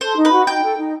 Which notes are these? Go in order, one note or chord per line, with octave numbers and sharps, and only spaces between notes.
A4 C5
D#4
B4
F#4
D#4 G5
A4
D#4